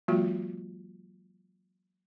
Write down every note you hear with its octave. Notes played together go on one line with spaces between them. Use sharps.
E3 F#3 G#3 A#3 F4 F#4